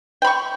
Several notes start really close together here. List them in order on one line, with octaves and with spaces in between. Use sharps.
G5 B5 C#6